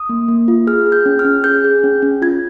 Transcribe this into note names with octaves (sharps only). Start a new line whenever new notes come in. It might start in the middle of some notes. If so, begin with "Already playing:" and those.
Already playing: D#6
A#3
A#3
F4
G#4 F6
G#4
G6
C#4
F6
C#4
G#4 G6
G#4
C#4
C#4
F4 G#6